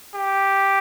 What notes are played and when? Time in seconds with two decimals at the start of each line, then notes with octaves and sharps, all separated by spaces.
0.15 G4